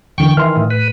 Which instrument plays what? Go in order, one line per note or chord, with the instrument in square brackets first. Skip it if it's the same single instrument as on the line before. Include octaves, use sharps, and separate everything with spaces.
[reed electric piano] E2 D3 E3 [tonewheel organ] G5 C#6
[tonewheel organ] D#3 E3 [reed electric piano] E5 C6 F6
[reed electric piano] A2
[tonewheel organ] B4